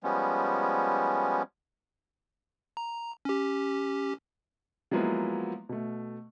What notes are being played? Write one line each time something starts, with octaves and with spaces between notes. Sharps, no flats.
F3 G3 G#3 B3 C#4
A#5
C#4 G4
F3 F#3 G#3 A#3 B3 E4
B2 A3